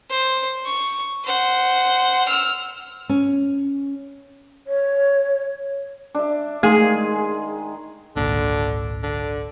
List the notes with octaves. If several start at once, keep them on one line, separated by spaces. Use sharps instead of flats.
C5
C#6
C5 F#5
E6 F6
C#4
C#5
D4 E5
D#3 G#3 A3 G#4
G#1 C#2 A#2 D3
D3